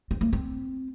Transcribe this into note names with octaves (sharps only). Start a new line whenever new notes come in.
C4
A#3
C4